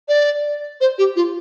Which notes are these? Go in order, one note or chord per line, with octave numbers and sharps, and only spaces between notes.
D5
C5
G4
F4